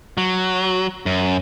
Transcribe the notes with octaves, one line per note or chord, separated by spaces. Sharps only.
F#3
F#2